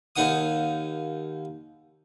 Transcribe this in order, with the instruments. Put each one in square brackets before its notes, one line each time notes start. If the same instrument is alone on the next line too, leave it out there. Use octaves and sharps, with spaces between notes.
[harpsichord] D#2 A#3 D#4 F#5 D#6